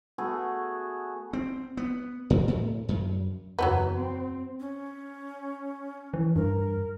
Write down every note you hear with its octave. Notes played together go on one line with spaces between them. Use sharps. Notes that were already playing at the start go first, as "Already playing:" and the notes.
A3 B3 F#4 G#4
C4
B3
G#2
A2
F#2
F#1 E2 F#3 A3 B3
C4
C#4
E3
G2 A#4